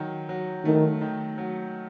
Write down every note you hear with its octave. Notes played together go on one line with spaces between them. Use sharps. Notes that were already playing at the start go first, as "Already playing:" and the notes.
Already playing: D#3 F#3
F#3
D#3 A3
D#3
F#3